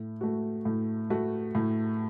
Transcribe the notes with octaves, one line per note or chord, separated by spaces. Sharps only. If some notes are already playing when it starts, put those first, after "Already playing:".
Already playing: A2
A3 F#4
A2
A3 F#4
A2